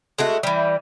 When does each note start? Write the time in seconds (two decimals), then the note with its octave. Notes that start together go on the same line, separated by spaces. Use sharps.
0.18 G#3 A3 F#4
0.43 E3 G3